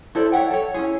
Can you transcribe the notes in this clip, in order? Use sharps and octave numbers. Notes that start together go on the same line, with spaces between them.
E4 A4 C5 D5
C#5 E5 F#5 G5
A4 C#5
C#4 D#4 E4 G#4